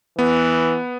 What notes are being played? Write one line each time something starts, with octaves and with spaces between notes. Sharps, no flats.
E3 B3